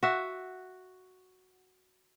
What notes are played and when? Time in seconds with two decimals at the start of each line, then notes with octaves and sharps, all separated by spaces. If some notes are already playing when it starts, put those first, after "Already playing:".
0.03 F#4 E5